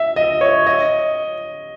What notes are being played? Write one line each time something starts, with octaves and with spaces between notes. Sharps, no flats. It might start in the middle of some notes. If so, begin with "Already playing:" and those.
Already playing: E5
D#5
C#5
D#5